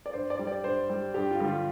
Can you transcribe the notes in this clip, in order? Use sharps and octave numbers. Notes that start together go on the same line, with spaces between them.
D5
G2 C5
D5
G3
D5
G2 C5
G3
G2 G4
F4
D3 G3
F4